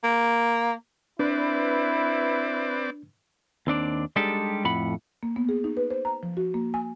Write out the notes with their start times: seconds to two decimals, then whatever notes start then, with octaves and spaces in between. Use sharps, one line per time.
0.04 A#3
1.19 C4 D4 E4 B4 D5
3.67 D#2 C4 D4 D5
4.16 G3 G#3 D4 D#4 G4 A4
4.65 F2 A2 F#5 B5
5.23 A#3
5.36 B3
5.49 G#4
5.64 D#4
5.77 B4
5.90 C5
6.05 A#5
6.23 F3
6.37 F#4
6.54 A#3
6.74 G#5